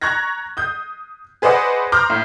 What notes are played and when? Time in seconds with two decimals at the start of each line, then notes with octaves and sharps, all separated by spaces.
0.01 A#5 C#6 F#6 G#6 A#6
0.57 D#6 G6
1.42 G#4 B4 C5 D5 D#5 F#5
1.92 A#5 C6 D6 F6 G6
2.10 A2